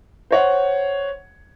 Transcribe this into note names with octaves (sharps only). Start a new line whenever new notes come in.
C5 C#5 F#5